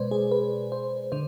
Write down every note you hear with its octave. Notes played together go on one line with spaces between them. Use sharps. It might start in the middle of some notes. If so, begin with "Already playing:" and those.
Already playing: B2 G#3 B4 C5 D5
G#4
B4
C5
D3 C5